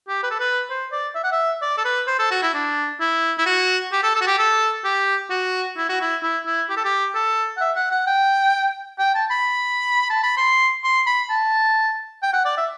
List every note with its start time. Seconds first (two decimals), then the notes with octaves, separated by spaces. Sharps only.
0.08 G4
0.23 B4
0.30 A4
0.39 B4
0.70 C5
0.92 D5
1.15 E5
1.24 F#5
1.32 E5
1.62 D5
1.77 A4
1.85 B4
2.07 C5
2.19 A4
2.31 F#4
2.42 E4
2.54 D4
3.00 E4
3.38 E4
3.46 F#4
3.92 G4
4.03 A4
4.15 A4
4.21 F#4
4.27 G4
4.38 A4
4.84 G4
5.30 F#4
5.77 E4
5.89 F#4
6.01 E4
6.23 E4
6.46 E4
6.69 G4
6.77 A4
6.85 G4
7.15 A4
7.57 F#5
7.61 E5
7.76 F#5
7.91 F#5
8.07 G5
8.99 G5
9.15 A5
9.31 B5
10.10 A5
10.23 B5
10.37 C6
10.84 C6
11.07 B5
11.30 A5
12.23 G5
12.33 F#5
12.45 D5
12.57 E5